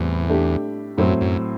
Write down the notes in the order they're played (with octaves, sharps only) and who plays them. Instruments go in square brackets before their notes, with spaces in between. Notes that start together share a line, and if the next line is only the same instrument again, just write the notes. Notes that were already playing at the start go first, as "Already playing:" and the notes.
Already playing: [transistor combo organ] E2 [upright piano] A2 G3 C4
[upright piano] A3 D4 G4
[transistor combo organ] F#2 [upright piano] A2 F#3 C4
[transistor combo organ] F#2